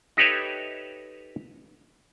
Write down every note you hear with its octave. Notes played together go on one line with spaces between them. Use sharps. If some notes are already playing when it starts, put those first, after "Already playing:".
D#4 G4 A4 B4 C#5 E5